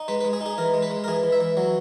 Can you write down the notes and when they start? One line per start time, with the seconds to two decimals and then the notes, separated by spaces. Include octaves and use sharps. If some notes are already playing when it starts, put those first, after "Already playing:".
Already playing: D#4
0.08 G#3 B4
0.21 B4
0.25 G#3
0.33 G#4
0.41 D#4
0.46 G#4
0.58 E3 A#4
0.74 G#3
0.82 B4
0.91 G#3
1.04 A#4
1.08 E3 G#4
1.23 E3
1.32 E5
1.40 E3
1.57 F#3